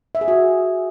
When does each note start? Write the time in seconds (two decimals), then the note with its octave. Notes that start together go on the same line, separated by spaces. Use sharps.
0.15 E5
0.21 G#4
0.28 F#4